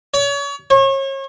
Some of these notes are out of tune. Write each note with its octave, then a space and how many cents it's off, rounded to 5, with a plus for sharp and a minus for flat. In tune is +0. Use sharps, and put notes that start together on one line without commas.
C#5 +35
C#5 -35